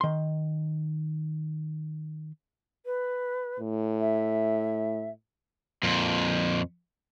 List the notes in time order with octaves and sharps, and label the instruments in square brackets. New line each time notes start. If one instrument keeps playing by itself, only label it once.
[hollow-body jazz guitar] D#3 C6
[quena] B4
[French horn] A2
[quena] E5
[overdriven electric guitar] F2 A#2